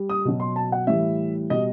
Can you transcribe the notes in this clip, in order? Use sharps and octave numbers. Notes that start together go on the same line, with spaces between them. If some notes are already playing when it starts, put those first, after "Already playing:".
Already playing: G3
D#6
B2 F#3
C6
A5
F#5
A2 E3 G3 E5
B2 G3 D#5